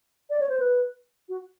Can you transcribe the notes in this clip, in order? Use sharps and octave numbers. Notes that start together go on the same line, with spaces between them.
D5
C#5
C5
B4
F#4